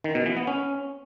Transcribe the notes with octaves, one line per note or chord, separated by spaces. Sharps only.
D#3
B2
E3
B3
C#4